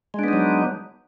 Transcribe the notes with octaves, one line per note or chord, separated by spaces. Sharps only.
F#3 G#3 B3 D4 D#4